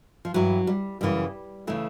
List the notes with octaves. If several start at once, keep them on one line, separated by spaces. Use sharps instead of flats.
F3
G2 E3 F#3
G3
F#2 C#3 E3 G3
C#3 E3 A3